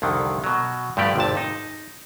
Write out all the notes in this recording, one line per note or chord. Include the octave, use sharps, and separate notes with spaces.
C2 F2 D3 D#3
B2 F#3
G2 D3 F3 A3 G4 D5
G#1 F2 C3 A5
D#4